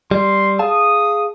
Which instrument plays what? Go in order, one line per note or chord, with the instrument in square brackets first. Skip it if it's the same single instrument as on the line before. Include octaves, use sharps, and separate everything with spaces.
[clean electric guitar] G3 [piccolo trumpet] C6
[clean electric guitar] G#4 F5 A5 [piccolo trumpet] D#6